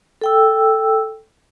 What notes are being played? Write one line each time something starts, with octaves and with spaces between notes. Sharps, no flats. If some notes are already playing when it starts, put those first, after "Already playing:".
A4 G5 E6